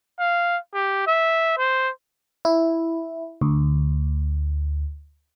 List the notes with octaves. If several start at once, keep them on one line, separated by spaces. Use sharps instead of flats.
F5
G4
E5
C5
E4
D2